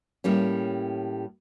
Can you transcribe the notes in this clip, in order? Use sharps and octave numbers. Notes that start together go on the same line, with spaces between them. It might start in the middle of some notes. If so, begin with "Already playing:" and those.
A2 G3 A#3 C#4